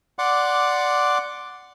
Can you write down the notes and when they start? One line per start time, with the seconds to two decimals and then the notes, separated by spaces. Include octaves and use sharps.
0.19 D5 F#5 C6 D6